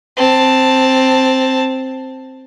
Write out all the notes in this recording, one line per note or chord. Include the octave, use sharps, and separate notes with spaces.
C4 A5